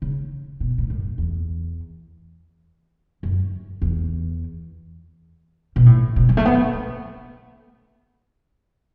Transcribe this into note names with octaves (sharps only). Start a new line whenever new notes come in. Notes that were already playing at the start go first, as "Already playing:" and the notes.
C#3
B2
A2
F#2
E2
F#2
E2
B2
A2
B2
F#3
A3
B3